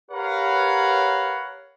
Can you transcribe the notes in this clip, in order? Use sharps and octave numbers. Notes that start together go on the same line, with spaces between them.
G4 A#4 B4 C#5 F5 F#5